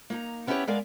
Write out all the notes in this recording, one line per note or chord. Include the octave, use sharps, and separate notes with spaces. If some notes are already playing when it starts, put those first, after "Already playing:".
A#3 D#4 A#5
B3 C#4 D4 E4 G4 C#5
G#3 B3 A#4 D5 F5 G#5